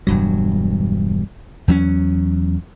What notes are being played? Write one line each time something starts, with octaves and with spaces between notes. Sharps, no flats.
E1 G2 F#3
E2 F#3 C4 C#4